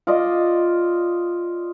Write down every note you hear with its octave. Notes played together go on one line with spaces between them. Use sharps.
F4 D5 D#5